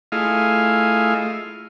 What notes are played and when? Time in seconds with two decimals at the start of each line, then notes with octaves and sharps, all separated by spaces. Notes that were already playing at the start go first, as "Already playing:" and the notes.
0.12 A3 E4 F4 G#4 D#5 F5